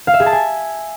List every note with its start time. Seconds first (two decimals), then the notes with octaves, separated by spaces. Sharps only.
0.07 F5
0.14 E5
0.20 G#4
0.26 A5
0.33 G#5